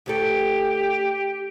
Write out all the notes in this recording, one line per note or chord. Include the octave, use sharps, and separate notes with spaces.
D2 C#4 G4 A4